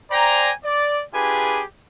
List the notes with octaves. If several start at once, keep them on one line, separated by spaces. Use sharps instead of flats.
C5 D5 G5 G#5 A#5
D5
D4 F4 G4 G#4 B4 G#5